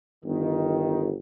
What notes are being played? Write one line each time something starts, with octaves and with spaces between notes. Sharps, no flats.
G1 D#3